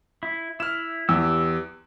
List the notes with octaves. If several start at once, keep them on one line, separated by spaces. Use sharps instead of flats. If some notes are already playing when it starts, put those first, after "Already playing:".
E4
E4 F6 E7
E2 G4 E6